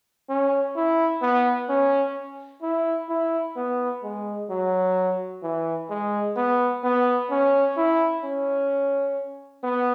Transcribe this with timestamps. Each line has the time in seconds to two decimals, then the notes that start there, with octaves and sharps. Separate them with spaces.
0.29 C#4
0.76 E4
1.22 B3
1.69 C#4
2.62 E4
3.10 E4
3.57 B3
4.04 G#3
4.50 F#3
5.43 E3
5.90 G#3
6.36 B3
6.84 B3
7.31 C#4
7.77 E4
8.24 C#4
9.63 B3